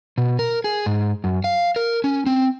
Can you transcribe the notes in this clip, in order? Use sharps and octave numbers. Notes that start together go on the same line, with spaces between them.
B2
A#4
G#4
G#2
F#2
F5
A#4
C#4
C4